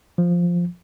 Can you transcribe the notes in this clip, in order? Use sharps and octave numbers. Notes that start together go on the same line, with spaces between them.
F3